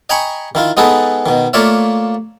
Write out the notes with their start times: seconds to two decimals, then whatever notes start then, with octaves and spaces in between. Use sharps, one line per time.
0.10 D#5 G5 G#5 A#5 B5 C#6
0.55 D#3 E4 F4
0.77 G#3 B3 D#4 G#4 A4 B4
1.26 B2 D#3
1.53 A3 A#3 F4 C#5 D5 E5